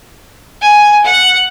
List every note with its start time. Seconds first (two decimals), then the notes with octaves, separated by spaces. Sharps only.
0.62 G#5
1.04 F#5